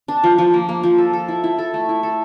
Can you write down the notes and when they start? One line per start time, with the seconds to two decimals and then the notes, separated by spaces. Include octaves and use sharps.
0.08 D4
0.24 F3
0.38 F3
0.53 A#3
0.69 A#3
0.83 F3
0.98 A4
1.13 A4
1.28 E4
1.44 E4
1.58 A4
1.74 A3
1.89 E4
2.03 A4